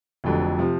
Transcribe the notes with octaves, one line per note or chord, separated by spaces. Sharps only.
F1 F2 D3 F#3
C3 F3